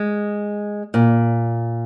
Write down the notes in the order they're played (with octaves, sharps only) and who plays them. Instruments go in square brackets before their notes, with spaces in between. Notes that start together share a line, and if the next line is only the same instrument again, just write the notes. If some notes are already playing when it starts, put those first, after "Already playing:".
Already playing: [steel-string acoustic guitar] G#3
A#2